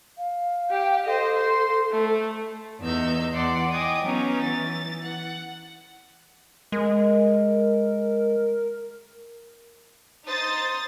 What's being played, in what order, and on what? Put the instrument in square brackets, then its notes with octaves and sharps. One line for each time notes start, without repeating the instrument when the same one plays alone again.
[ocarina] F5
[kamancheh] G4 G5
[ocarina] A4 [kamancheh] C5 D#5
[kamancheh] C5 C6
A3
[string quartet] E2 B3 D#4 E6 G6
E2 D5 F#5 C6
D#5 G5 G#5 D6 D#6
F#3 B3 C#4 D#4
E3 A6
F#5
[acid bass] G#3 [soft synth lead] A#4
[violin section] D#4 C5 D#6 A6